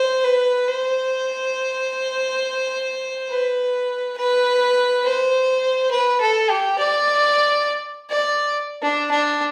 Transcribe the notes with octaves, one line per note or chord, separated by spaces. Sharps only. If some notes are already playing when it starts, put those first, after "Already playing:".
Already playing: C5
B4
C5
B4
B4
C5
B4
A4
G4
D5
D5
D4
D4